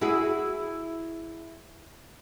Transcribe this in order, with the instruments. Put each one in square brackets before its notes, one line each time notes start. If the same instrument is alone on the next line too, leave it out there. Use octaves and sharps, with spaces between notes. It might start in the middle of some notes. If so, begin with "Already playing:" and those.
[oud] E4 F#4 G#4